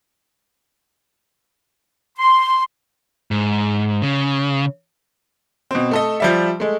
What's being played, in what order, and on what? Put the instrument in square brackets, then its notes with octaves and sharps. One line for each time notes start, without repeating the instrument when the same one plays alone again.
[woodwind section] C6
[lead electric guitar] G#2
C#3
[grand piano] B2 C4
A3 A4 D#5
F3 G3 E5
G#3 A3